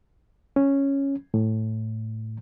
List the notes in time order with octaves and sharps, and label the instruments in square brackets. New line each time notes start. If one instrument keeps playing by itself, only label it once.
[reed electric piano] C#4
A2